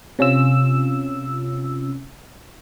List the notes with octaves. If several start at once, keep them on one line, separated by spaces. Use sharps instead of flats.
C3 C#4 F4 E6